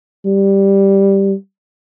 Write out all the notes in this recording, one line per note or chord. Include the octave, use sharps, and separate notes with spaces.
G3